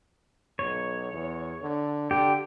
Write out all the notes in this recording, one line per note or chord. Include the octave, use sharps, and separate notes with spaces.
B1 C#5
E2
D3
D3 G4